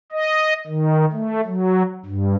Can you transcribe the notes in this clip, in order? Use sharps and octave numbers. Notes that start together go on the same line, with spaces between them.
D#5
D#3
A3
F#3
G2